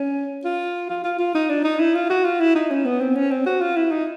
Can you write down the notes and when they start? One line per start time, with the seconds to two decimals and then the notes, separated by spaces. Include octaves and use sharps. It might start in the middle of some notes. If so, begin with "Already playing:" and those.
Already playing: C#4
0.45 F4
0.90 F4
1.04 F4
1.19 F4
1.35 D#4
1.50 D4
1.64 D#4
1.80 E4
1.95 F4
2.10 F#4
2.25 F4
2.40 E4
2.55 D#4
2.71 C#4
2.86 B3
3.01 C4
3.15 C#4
3.31 C4
3.46 F#4
3.62 F4
3.76 E4
3.92 D#4